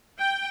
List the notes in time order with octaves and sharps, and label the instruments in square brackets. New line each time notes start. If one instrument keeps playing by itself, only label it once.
[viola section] G5